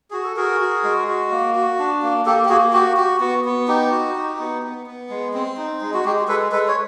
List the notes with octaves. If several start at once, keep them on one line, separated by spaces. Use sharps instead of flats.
F#4 G#4
A4
F#4 G#4 A#4
F#4
G#3
F#4
A#3
F#4
D4
A#3
A#3 G4 A4
G4
A#3 F#4 G#4
F#4 G4
F#4 G4
B3 F#4
B3
D#4 G4
F#4
D#4
B3
B3
B3
G#3
C4
D#4
G#3
F#4
G#3 G4
G#3 A4 B4
G#3 A4 B4
C#5